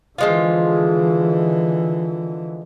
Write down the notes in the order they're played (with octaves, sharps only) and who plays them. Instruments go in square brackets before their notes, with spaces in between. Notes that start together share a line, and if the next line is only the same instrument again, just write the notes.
[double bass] D3 E3 [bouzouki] F3 G#3 F4